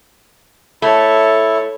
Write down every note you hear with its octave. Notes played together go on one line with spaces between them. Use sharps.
A3 E4 A4 C#5